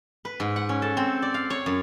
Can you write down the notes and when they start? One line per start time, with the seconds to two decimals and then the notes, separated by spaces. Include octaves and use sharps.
0.25 B4
0.40 G#2
0.56 F#5
0.69 C#4
0.82 A4
0.97 C4
1.22 D5
1.34 F5
1.50 C#5
1.66 F#2